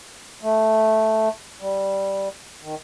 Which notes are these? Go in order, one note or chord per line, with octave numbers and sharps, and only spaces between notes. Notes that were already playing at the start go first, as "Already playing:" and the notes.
A3
G3
D#3